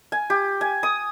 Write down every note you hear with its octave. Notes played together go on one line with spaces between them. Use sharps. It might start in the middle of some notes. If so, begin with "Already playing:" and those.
G#5
G4
G#5
D#6